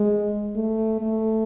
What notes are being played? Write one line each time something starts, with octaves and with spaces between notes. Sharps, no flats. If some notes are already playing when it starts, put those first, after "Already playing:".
Already playing: G#3
A3
A3